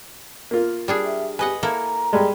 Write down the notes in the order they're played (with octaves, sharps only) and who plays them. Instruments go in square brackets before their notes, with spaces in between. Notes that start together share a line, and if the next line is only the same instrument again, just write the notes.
[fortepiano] A#3 F4
[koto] G3 D4 G#4
[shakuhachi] E5
[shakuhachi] G4 [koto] B4 D#5 F#5 [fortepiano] G#5
[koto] A#3 E4 A4 [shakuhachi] A#5
[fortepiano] G3 G#3